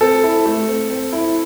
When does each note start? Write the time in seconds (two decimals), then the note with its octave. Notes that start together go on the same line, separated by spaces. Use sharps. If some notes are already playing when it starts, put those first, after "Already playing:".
0.01 C4 A4
0.23 E4
0.46 A3
0.68 C4
0.90 C4
1.13 E4